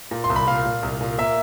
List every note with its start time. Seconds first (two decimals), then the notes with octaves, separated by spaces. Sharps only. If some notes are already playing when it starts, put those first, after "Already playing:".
0.11 A#2
0.24 C6
0.30 C2
0.36 B5
0.47 A#2 F5
0.66 A#2
0.83 C2
1.01 A#2
1.18 A#3 E5